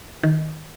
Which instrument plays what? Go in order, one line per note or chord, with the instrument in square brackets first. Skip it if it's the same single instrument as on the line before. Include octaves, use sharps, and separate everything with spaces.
[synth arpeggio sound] D#3